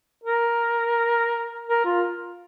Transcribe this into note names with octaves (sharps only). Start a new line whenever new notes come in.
A#4
A#4
F4